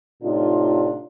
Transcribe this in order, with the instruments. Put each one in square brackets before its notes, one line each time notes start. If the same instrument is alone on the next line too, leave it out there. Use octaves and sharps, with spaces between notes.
[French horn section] A2 C3 D4 D#4 F4